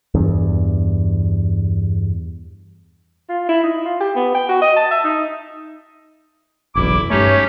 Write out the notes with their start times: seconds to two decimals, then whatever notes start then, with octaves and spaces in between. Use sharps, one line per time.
0.15 E2 G2
3.29 F4
3.49 E4
3.63 D#4
3.85 F4
4.00 G4
4.16 B3
4.35 G5
4.49 F#4
4.62 D#5
4.76 A5
4.91 E5
5.04 D#4
6.75 F#1 B1 E2 E4 D6
7.10 G2 A3 C#4 D#4 G4 C#5